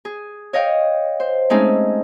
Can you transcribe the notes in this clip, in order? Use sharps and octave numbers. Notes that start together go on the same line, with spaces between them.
G#4
C#5 D#5 F5 G5
C5
G#3 A3 C4 C#4 D#4 G#4